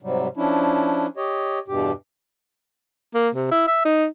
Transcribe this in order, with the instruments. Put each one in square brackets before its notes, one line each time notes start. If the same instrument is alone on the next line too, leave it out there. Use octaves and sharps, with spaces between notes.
[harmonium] G#2 C3 F#3 G3
F3 C#4 D4 E4
G4 C#5 D#5
E2 G2 B2 G4
[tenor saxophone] A#3
C3
E4
E5
D#4